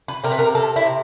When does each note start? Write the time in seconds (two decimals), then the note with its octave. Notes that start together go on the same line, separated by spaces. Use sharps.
0.08 B4
0.24 C3 A#4
0.32 B4
0.39 A#4
0.55 C3 A4
0.76 E4
0.86 C3